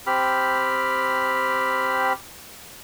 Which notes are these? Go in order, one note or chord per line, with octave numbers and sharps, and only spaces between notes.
C4 G4 B5 F6